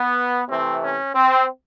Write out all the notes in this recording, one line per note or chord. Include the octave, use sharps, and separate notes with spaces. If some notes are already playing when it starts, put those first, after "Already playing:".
Already playing: B3
C3 E3 A3 C4
C#4
C4